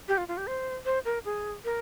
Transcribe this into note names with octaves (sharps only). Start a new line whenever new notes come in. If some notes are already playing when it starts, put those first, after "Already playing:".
G4
F4
F4
G4
C5
C5
A#4
G#4
A#4